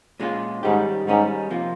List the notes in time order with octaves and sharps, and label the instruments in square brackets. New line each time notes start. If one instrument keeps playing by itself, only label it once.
[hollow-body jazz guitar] A#2 G#3 C#4 F4
[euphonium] G#2 [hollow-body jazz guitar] D#3 G3 C#4 G4
[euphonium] G#2 [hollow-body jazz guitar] D#3 G3 C#4 G4
[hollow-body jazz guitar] C3 F3 A#3 F4